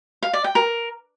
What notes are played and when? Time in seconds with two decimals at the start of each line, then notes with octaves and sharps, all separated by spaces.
0.23 F5
0.33 D5
0.44 G5
0.55 A#4